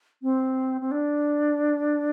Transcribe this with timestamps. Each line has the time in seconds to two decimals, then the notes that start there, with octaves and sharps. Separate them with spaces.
0.22 C4
0.81 C4
0.91 D4